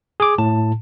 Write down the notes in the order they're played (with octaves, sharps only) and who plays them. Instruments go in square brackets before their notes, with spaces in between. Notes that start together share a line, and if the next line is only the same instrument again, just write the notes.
[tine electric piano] G#4 D6
A2 A5